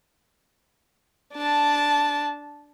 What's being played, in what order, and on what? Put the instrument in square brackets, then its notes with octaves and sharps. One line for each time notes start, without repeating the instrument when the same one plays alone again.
[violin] D4 A5